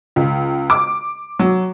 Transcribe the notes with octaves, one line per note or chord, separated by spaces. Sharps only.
C#2
D6
F#3